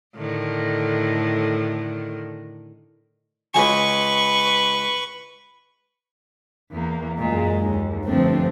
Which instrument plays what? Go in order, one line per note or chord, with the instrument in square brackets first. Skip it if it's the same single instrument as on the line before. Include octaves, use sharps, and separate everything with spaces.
[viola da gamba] A2 D3 D#3
[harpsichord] C#2 G#5 [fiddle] B4 C#6
[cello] E2 A#3
[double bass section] F#2 G#3 [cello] A#2
[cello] D#2
[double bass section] G1 A3 C4 [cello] F3 D4